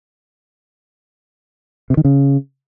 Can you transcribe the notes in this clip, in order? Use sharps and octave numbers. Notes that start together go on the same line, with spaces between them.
C3
D#3
C#3